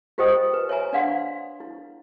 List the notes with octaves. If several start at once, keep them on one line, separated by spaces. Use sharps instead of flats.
F4 G4 C5 D#5 G5 D#6
B4
C#5 E5 G#5 A#5
D4 D5 F5 F#5 C6
E4